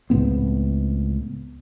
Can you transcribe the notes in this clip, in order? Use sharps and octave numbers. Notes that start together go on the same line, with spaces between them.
C#2 A2 B3 C4